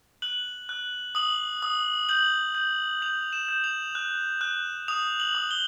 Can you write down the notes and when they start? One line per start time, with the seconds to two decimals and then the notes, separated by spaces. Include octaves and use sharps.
0.22 F#6 F#7
0.69 F#6
1.15 D#6 F#7
1.62 D#6
2.09 G6 F#7
2.55 G6
3.02 G6 F7
3.33 E7
3.49 G6
3.64 F7
3.95 F#6
4.41 F#6
4.88 D#6 F7
5.20 F#7
5.35 D#6
5.51 G7